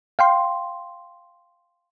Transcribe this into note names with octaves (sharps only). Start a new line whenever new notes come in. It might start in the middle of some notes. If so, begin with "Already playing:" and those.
F5 G5 C6